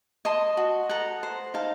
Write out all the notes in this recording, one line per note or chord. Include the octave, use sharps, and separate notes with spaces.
D#5 A5 C6
F#4
A4 F#5 A#5
C5
D#4 F5 A5